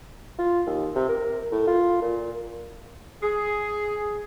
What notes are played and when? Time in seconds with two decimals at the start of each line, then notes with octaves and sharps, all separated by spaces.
0.38 F4
0.66 D#2
0.95 C3
1.08 A#4
1.52 A2
1.67 F4
2.01 A#2
3.23 G#4